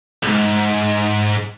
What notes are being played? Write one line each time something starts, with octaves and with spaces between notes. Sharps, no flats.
B1 G#2